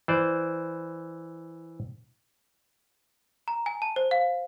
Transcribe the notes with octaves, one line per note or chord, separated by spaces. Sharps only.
E3 C5 D5
A#5
G#5
A5
C5
F5